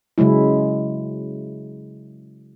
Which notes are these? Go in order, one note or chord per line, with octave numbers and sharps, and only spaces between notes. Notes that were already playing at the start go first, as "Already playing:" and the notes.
C#3 F#3 G#3 E4